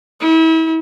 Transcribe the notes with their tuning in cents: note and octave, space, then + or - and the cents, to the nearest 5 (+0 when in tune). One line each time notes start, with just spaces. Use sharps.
E4 -35